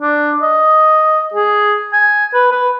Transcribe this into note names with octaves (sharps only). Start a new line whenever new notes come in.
D4
D#5
G#4
G#5
B4
B4